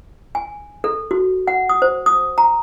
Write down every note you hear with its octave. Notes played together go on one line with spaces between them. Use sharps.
G#5
A4
F#4
F#5
D#6
C5
D#6
A#5